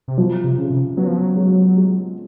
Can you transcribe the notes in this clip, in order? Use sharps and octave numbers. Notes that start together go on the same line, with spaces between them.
C3
B2 F3
C3
C#3
C3
F#3 B3
F3
F#3
G#3
G#3